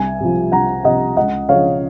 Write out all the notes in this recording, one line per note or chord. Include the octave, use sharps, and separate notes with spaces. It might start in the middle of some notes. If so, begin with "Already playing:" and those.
Already playing: C2 G#5
C3 F3
C2 F#5 A#5
C3 F3 D#5 F#5
C#2 D#5 F#5
C#3 F3 C#5 F5